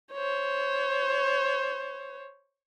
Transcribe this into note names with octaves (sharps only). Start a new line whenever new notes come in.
C5 C#5